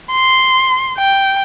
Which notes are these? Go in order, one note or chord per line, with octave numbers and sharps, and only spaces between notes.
C6
G5